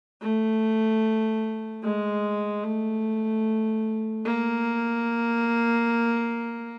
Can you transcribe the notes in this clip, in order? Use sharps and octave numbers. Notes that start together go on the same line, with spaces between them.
A3
G#3
A3
A#3